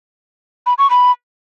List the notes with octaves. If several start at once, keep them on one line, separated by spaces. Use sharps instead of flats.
B5
C#6
B5